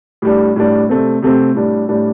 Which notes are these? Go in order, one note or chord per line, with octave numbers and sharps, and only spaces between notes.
A2 G3 D4
A2 G3 D4
C3 A3 C4
C3 A3 C4
A2 G3 D4
A2 G3 D4